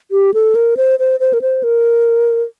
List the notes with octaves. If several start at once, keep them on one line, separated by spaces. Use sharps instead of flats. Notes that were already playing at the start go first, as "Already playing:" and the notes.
G4
A4
A#4
C5
C5
C5
A#4
C5
A#4